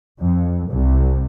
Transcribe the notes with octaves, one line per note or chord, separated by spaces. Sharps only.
F2
C2